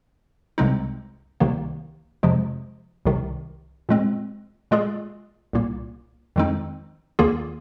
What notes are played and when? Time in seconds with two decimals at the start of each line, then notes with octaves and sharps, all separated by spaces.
0.58 C2 C3 G#3 C4 D#4
1.40 C2 C3 D#3 A#3
2.23 F2 C3 F3 G#3
3.06 C2 C3 D#3
3.89 A#2 G#3 C4
4.71 A#2 G#3 F4 G#4
5.53 C2 A#2 A#3
6.36 F2 D#3 G#3 C4 D#4
7.19 D#2 D#3 A#3 F4 G#4